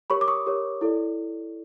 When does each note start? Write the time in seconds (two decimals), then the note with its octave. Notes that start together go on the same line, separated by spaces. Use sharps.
0.10 G4 A#4 C#5 B5 C#6
0.21 D6
0.28 C#6 D#6
0.46 G4 A#4 C#5
0.81 E4 A4 D5